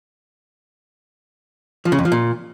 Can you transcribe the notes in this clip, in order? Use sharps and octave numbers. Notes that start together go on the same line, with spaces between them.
F3
C#3
F2
F3
A#2